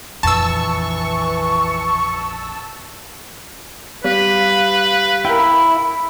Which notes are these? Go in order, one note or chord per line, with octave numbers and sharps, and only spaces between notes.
A#1 F2 E3 A5 C#6 E6
G3 B4 F5
E4 A#4 G5
B5